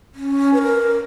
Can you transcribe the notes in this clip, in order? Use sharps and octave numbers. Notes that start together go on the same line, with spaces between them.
C#4
B4
A#4